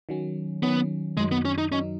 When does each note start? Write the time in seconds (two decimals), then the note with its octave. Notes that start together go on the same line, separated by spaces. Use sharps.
0.09 D#3 F#3 C#4
0.63 D#3 F#3 B3 C#4
1.17 F#2 D#3 F#3 G#3 D#4
1.32 B3
1.45 C#4
1.58 D#4
1.72 F#2 D#3 F#3 C#4 D#4